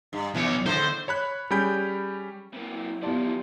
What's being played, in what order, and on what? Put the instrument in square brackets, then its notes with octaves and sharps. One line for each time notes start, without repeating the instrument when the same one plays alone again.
[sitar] G2
[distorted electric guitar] B1 C#5 [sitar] E3
[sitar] D#2 A2 D3 [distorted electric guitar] C5
[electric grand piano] C#5 B5 F#6
G3 C#4 G#4 B5 G6 D7
[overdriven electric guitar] C3 A#3 [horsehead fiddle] F#3 E4
[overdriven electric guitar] D#3 F3 [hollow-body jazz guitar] B3 D5 [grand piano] F4 G4 A5